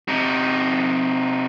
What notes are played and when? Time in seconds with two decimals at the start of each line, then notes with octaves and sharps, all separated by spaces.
0.08 C3 D#4